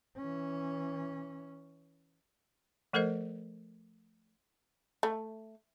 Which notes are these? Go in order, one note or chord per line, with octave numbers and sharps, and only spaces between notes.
E3 C#4
F3 A3 A4 A#4 C5 D#5
A3